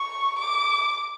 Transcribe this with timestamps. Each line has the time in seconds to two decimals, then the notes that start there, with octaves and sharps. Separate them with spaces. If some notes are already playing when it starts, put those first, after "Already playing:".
Already playing: C#6
0.39 D6